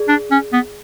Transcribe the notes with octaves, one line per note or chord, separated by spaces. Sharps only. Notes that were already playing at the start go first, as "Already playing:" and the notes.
Already playing: G#4 D5
D4
C#4
B3